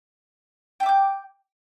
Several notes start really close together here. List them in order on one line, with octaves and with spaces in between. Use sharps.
G5 E5 D6 G6